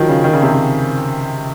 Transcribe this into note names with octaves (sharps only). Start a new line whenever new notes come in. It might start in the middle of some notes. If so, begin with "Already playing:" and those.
Already playing: D#3 F3 F#3
C#3
D#3
C#3
C3
C#3